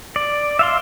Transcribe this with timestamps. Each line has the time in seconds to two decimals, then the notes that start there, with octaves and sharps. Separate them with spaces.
0.16 D5
0.59 E5 F5 C6